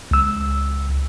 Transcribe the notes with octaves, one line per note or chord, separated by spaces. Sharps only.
C#2 E6